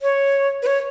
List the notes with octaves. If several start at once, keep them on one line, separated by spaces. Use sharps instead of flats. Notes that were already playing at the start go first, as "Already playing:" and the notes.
C#5
B4
C#5